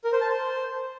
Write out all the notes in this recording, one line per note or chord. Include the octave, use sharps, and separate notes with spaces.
A#4
C5
A5
C5